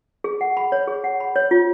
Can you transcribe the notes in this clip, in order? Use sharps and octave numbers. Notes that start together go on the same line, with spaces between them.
G#4
F#5
B5
C#5
G#4
F#5
B5
C#5
F4